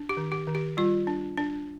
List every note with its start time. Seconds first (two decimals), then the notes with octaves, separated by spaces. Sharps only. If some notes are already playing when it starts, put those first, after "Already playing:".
Already playing: D4
0.09 G4
0.17 D#3
0.32 G4
0.47 D#3
0.55 G4
0.77 G3 F4
1.07 D4
1.37 D4